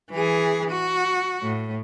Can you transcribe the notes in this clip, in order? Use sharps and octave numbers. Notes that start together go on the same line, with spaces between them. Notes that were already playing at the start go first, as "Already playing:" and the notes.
E3 G#4
F#4
A2